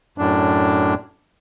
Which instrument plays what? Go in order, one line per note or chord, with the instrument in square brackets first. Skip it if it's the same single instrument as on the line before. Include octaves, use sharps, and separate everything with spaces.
[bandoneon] F#2 A2 D4